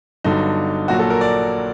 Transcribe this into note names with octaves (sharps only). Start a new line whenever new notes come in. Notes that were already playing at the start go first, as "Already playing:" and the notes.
G1 G2 D3 F#3 D#4
A#1 A#2 F#3 F#4
A4
A#4
D5